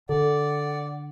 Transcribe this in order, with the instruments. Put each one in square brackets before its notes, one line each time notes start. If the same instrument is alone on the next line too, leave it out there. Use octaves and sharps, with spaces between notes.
[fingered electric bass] D3 [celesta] A4 [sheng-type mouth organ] D5 [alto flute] F#5